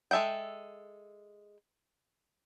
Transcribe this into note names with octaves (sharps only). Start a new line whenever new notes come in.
G#3 A4 E5 F#5 G5